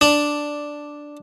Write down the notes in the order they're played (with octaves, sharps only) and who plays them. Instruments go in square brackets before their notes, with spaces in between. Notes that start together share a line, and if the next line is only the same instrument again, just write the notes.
[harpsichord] D4